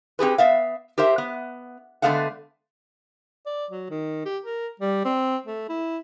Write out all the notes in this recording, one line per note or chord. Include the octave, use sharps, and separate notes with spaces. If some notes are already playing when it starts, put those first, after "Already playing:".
C4 G4 G#4 B4
B3 E5 F5
G4 A#4 C5 E5
B3
D3 G#3 A3 B3 F5 F#5
D5
F#3
D#3
G4
A#4
G3
C4
A3
E4